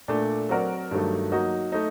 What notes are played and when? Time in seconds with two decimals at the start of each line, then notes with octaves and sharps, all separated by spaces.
0.08 A#2 A3 D4
0.49 F#3 C4 F#4 A#4 D5
0.91 G2 D#3 F#3 A3
1.32 F#3 A#3 D#4 F#4
1.72 A3 D#4